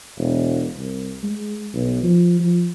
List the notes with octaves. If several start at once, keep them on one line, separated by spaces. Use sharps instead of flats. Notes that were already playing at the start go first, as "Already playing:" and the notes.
E1
C2
G#3
B1
F3
F3